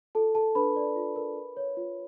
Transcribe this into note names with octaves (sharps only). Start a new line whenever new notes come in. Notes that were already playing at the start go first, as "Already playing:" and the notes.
F4 A4 A5
A4 A#4 A5
D4 B4 B5
D5
F4
A#4
A#4
C#5
F4